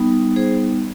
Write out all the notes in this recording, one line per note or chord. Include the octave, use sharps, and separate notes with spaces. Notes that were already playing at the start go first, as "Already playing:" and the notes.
Already playing: G3 B3 D#4
G#4 C5